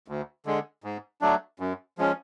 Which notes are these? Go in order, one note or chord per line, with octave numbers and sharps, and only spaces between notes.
D2
D3 G#3
G#2
F#3 A3 D4
F#2
F3 G#3 C#4